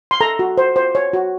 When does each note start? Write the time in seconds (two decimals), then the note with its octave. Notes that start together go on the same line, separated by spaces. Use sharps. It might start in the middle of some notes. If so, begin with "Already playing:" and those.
0.11 C6
0.21 A4 A#5
0.39 F#4
0.58 C5
0.76 C5
0.95 C#5
1.13 F#4